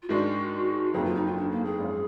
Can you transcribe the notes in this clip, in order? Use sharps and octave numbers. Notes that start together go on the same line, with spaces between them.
F4
G#2 D#3 G#3 D4 F#4
F#1 F2 D#3 F#3 B3 G#4
F4
D#4
F4
D4
A#3
G#4
G#1 F#2 F3 G#3